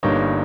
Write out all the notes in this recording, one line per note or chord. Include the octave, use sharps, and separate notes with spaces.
G1 G2 G3 A#3 D#4 C#5